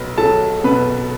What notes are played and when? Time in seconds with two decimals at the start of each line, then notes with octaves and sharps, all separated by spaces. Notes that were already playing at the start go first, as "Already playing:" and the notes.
Already playing: B1 B4
0.18 F#3 A4 A5
0.64 B2 B4 B5